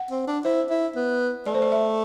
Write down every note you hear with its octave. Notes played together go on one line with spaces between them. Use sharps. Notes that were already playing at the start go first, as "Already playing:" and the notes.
Already playing: F#5
C4
D4
E4 C5
E4
B3
A3 D5
C5
D5
E5